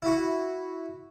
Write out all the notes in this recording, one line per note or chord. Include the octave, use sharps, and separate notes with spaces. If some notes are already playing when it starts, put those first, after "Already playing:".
E4 F#4